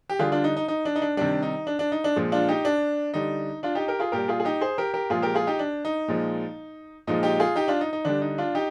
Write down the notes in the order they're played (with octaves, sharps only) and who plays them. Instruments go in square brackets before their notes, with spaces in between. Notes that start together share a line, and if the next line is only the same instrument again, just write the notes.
[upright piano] G4
D3 G3 F4 G#4
D4 F4
D#4
D#4
D#4
D4
D#4
D4
C3 D#3 G3 D4
D#4
D4
D4
D#4
D4
A#2 F3 G#3
D4 F4
D#4 G4
D4
D3 G3 D#4
D4 F4
D#4 G4
G4 A#4
F4 G#4
A#2 G3 G4 A#4
F4 G#4
G#4
D#4 G4
G#4 C5
G4 A#4
G4 A#4
A#2 F3 G#3 F4 G#4
G4 A#4
F4 G#4
D#4 G4
D4
D#4
A#2 F3 G#3
A#2 F3 G#3 D#4
D#4 G4
F4 G#4
D#4 G4
D4 F4
D#4
D#4
D3 G3 D4
D#4
D4 F4
D#4 G4